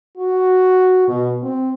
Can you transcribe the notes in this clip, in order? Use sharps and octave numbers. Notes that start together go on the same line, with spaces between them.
F#4
B2
C4